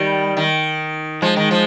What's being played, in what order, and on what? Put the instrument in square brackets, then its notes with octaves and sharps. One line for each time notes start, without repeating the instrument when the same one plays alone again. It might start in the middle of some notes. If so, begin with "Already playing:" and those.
Already playing: [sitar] D#3 [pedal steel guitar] G3
[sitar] D#3
[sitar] F3 [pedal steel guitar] G#3
[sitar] D#3
F3